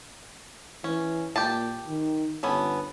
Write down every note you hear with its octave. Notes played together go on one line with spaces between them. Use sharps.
E3 C#4
A#2 G4 G5 A5
D#3
G1 B3 C#4 A4